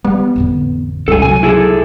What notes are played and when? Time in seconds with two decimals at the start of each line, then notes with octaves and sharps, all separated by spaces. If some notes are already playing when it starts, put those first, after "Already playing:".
0.05 G3 B3
0.36 A1 F2 D3
1.08 C#2 G2 A4 G#5
1.22 C3 F#3 G#5
1.43 E4 G#4 A4